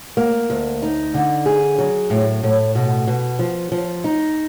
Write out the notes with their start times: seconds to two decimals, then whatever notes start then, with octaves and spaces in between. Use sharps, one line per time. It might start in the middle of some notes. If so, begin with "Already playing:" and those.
0.17 A#3
0.50 D2
0.82 D#4
1.14 D3
1.46 G#4
1.78 F#3
2.10 A2
2.43 A2
2.75 B2
3.07 B2
3.39 F3
3.72 F3
4.04 D#4